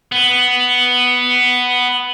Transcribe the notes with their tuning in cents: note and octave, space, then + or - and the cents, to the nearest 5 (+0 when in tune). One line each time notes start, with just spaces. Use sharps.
B3 +5